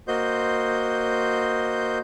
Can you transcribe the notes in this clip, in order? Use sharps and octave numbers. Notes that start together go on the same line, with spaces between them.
A#3 F#4 C5 D#5 C6 G6